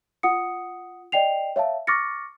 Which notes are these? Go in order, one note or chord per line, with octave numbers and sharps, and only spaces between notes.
F4 F#5 D#6 C#7
D5 D#5 G5 C7 F7
C#5 E5 F5 A5
C#6 D6 F6 A6 A#6 C#7